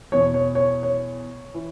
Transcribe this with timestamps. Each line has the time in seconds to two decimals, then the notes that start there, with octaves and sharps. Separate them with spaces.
0.12 E2 B2 C#5
0.34 C#5
0.55 C#5
0.83 C#5
1.54 E3